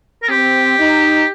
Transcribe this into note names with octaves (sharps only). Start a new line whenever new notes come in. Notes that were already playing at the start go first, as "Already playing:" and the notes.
A#4
C4 G4
D#4